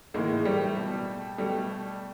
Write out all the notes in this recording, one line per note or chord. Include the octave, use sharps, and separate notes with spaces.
A2 E3 G#3 A#3
G3 A3
B2
B2 G3 A3